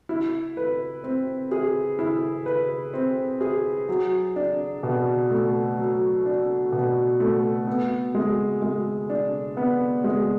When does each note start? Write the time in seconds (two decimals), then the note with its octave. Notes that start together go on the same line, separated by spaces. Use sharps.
0.09 E4
0.57 B4
1.04 C4
1.51 G#4
1.99 E4
2.46 B4
2.94 C4
3.41 G#4
3.89 F#3
4.36 D4
4.83 B2
5.30 A3
5.78 F#3
6.26 D4
6.72 B2
7.20 A3
7.67 B3
8.15 G#3
8.62 G#3
9.10 D4
9.57 B3
10.04 G#3